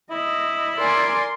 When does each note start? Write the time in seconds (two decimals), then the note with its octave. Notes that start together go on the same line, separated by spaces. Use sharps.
0.11 E4 D#5
0.77 A#4 D5 G#5 C6